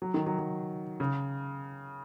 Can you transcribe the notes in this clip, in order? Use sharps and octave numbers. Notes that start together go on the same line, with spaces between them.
F#3
D#3
F#3
F#3
C#3